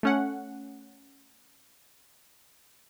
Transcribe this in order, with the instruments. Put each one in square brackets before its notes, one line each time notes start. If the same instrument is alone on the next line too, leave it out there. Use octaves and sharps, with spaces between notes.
[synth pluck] A3 C#4 F#5